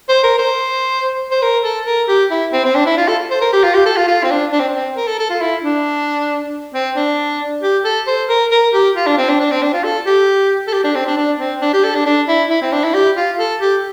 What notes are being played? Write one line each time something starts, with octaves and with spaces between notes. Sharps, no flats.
C5
A#4
C5
C5
A#4
A4
A#4
G4
E4
C4
C4
D4
E4
F4
A4
C5
A#4
G4
F4
G4
A4
F4
F4
C4
D4
D4
C4
C4
A#4
A4
A4
F4
E4
D4
C4
D4
G4
A4
C5
A#4
A#4
G4
F4
D4
C4
D4
D4
C4
D4
F4
A4
G4
A4
G4
D4
C4
D4
D4
C4
D4
G4
A4
D4
D4
E4
E4
C4
D4
E4
G4
F4
A4
G4